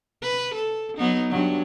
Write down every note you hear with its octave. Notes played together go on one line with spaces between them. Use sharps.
B4
A4
F#3 B3 D#4
G2 F#3